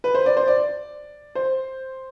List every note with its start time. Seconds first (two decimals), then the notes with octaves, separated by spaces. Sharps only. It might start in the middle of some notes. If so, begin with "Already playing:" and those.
0.04 B4
0.15 C5
0.26 D5
0.37 C5
0.47 D5
1.35 C5